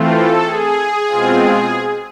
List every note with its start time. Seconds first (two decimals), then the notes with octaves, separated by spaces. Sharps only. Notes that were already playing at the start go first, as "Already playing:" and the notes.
Already playing: E3 A3 C4 F4
0.13 A4
0.45 G#4
1.07 B2 G#3 C4 F4